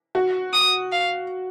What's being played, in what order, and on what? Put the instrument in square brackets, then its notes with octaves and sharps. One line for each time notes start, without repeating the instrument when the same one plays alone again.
[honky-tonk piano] F#4
[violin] D#6
F5